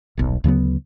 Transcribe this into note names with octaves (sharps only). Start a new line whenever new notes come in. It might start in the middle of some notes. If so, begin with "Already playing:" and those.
D#1 B1
D2 C#3 F#3 B3